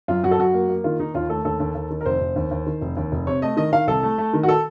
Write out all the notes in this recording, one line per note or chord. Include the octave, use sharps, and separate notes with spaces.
F#2 F4
F#2 F#4
A4
F#2 F#4
A#3
A#3
D#3 F4
D#3 D#4
D#2 F4
A3 A4
D#2 A4
D#2
D#2
D#3
A#4
F1 C5
F1
D#2
D#2
D#3
F1
D#2
F1
C3 C#5
A3 D#5
D#3 D#5
D#3 F5
C2 A4
A3
A3
D#3
F#4
A4